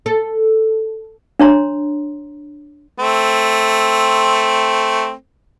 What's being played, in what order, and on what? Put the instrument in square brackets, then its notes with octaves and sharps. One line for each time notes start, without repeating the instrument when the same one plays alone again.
[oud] A4
[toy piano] D4 C#5 A#5 C6
[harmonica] A3 C4